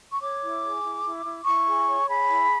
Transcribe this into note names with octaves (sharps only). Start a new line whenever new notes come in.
C#6
C#5 D6
E4
G#4
E4
E4
E4
E4 C#6
G#4
C#5
G#4 B5
E4